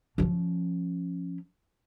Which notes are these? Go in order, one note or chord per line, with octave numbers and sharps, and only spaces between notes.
F3 C#4